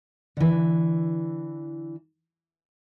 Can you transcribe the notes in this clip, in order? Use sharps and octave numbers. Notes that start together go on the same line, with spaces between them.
D3 E3